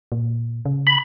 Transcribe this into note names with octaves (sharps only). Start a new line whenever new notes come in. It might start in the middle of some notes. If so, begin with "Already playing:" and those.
A#2
C#3
B5